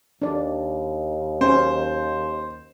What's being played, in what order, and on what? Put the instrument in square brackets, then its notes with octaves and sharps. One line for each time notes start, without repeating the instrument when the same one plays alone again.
[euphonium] D#2 [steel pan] D4 D5
[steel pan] C#4 [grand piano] C5